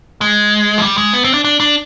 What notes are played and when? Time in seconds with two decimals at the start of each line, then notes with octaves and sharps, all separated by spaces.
0.21 G#3
0.78 F3
0.82 G3
0.98 G#3
1.13 B3
1.24 C4
1.34 D4
1.44 D4
1.60 D4